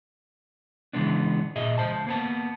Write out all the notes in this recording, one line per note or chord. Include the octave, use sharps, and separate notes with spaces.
C#3 E3 G#3 B3 D4
A#2 G#4 D#5 E5
C#2 C5 A5
A#3 B3 A5